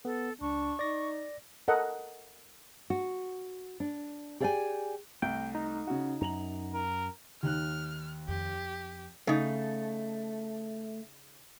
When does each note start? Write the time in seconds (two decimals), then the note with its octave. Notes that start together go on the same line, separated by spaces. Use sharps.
0.05 B3 A4
0.41 C#2 D4 C#6
0.79 D#4 D5 A#6
1.68 A4 A#4 D#5 F#5
2.90 F#4
3.80 D4
4.40 G4 G#4 D5 F5 G5 G#5
5.22 C2 A3 G5
5.55 D#4
5.87 C#3 F#4
6.21 F#2 A#5 F7 F#7
6.73 A#4
7.43 D#2 D#4 F6 F#6
8.28 F2 G4
9.27 C#3 A3 D#4